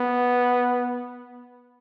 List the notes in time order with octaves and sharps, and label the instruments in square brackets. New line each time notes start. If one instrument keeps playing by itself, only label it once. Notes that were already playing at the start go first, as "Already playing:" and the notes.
Already playing: [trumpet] B3